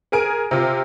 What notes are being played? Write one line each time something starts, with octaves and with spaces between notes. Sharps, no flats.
G#4 A#4 G#5 D7
C3 F4